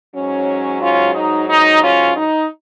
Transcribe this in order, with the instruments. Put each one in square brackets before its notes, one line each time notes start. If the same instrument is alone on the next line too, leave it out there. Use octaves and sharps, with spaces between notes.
[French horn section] G#2 F#3 C#4
C#4 F4
D#4
D#4
C#4 F4
D#4